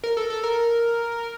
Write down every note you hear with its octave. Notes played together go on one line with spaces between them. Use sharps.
A#4
A4
A4
A#4